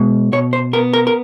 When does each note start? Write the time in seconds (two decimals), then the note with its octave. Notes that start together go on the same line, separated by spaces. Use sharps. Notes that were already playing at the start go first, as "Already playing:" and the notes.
Already playing: B2 G#3
0.32 B2 C#5
0.53 C5
0.73 B3 A#4
0.93 A#4
1.07 A#4